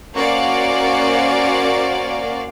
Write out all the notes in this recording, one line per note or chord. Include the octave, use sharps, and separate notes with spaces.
A#3 C#4 F#4 C5 D5 F5